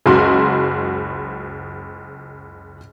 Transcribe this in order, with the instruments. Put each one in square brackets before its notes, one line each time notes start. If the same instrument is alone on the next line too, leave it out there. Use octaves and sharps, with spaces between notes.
[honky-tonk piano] F#1 C#2 F#4 C6